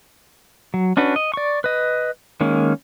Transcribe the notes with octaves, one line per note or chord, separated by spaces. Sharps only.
F#3
C#4 D4 F#4 B4
D#5
D5 C#6
B4 D#5
D#3 G#3 A#3 C#4